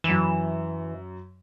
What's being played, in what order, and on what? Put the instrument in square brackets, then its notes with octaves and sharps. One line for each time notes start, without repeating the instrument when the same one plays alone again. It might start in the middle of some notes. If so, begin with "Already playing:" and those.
[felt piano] F#2 E7 [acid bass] E3